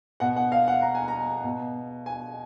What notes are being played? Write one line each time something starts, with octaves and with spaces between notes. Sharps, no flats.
B2 F#5
F#5
F5
F#5
A#5
G#5
A#5
B2
G#5